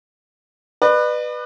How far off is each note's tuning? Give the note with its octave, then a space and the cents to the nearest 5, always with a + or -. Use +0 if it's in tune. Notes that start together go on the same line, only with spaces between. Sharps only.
B4 +0 D5 +45